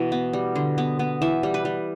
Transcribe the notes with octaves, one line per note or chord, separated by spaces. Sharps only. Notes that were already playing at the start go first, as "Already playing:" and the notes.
Already playing: B2 E3
B3
G3
D3
B3
B3
E3 E5
G3
B4
G3